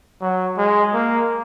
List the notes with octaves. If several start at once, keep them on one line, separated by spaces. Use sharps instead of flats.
F#3
G#3
A#3